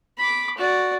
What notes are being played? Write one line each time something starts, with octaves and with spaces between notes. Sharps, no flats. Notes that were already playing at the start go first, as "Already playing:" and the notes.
B5 D6
F#4 D5